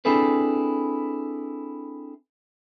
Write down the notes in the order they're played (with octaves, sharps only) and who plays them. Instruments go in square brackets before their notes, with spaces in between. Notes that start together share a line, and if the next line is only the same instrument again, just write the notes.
[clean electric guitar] C4 D4 E4 G#4 A4 B4